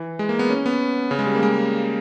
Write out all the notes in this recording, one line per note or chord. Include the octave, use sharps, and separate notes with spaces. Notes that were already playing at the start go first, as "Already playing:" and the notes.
Already playing: E3
G#3
A#3
B3
C#4
B3
C#3
G#3
G3
A#3
G#3